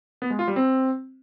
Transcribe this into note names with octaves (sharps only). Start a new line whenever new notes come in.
B3
G#3
F4
G3
C4